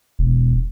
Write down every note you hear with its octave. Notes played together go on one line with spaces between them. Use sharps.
E1